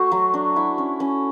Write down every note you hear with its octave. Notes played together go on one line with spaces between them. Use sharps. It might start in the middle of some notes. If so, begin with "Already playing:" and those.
Already playing: A3 F#4 C5
F#3
D4
E4
C#4
C#4